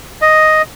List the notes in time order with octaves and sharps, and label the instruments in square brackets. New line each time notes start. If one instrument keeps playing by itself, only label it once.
[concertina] D#5